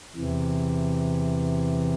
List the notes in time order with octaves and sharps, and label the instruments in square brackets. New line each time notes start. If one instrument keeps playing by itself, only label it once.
[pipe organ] E2 C3 E3